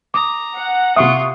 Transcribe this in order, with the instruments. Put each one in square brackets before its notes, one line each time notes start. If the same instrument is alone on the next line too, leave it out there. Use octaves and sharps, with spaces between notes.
[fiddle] A#5 [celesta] D6 D#6
[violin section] F#5
[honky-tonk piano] C3 C#6 D#6 [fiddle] F4 [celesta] E5